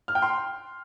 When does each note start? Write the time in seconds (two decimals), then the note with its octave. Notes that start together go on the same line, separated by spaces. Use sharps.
0.08 F6
0.15 G5
0.22 C6